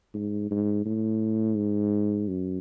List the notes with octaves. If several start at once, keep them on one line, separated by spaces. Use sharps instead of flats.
G#2
G#2
A2
G#2
F#2